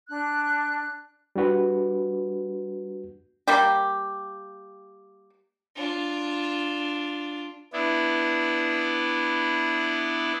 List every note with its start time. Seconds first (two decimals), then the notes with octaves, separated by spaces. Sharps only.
0.08 D4 F#6
1.36 G3 D4 F#4 B4
3.48 G3 A#3 G4
5.76 D4 F4
7.73 B3 D4 E4